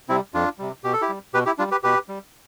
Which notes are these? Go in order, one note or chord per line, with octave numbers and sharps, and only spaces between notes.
C3 G3 C4 E4
F2 D4 F4
C3 G3
B2 G4
A4
E4 G4
G3
B2 G4 B4
E4 G4
G3 D4 F4
G4 B4
B2 G4 B4
G3